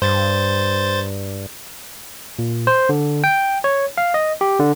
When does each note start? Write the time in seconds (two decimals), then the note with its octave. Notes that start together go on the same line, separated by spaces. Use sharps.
0.02 G2 C5 A6
2.39 A#2
2.67 C5
2.89 D3
3.24 G5
3.64 C#5
3.98 F5
4.14 D#5
4.41 G4
4.59 D3